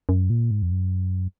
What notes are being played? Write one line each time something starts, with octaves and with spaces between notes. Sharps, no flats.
F#2
A#2
G#2
F2
F#2